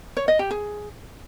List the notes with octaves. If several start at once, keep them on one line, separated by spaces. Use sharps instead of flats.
C#5
D#5
G4
G#4